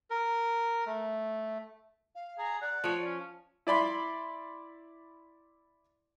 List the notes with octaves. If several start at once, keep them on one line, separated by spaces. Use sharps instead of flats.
A#4
A3
F5
G#4 A#5
D5 F#5
F3 C#5
C#4
E4 D5 B5 C6